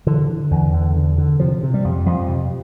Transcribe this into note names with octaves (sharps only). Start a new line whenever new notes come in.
D3 E3
D3
E2
E2 D3
D3
D3
C3 F3
C3
G3
F2
F2 F3
C3